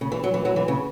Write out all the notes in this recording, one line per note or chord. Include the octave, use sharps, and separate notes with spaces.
C#3
E3
F#3
E3
F#3
E3
C#3